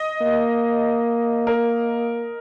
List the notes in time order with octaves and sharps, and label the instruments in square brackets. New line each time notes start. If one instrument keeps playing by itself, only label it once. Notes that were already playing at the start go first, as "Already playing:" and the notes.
Already playing: [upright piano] D#5
[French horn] A#3
[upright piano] A#4